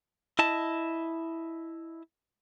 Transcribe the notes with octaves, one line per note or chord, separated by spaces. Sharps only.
E4 D#5 A5